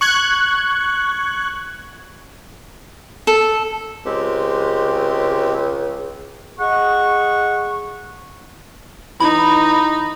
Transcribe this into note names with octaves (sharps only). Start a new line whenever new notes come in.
C#6 F#6 G#6
A4
C#2 G#3 C4 G4
G#4 D#5 F#5 C#6
E3 D#4 B5